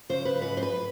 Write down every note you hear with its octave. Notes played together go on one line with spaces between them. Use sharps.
C#3 C5
B4
G#2 B4
C5
B4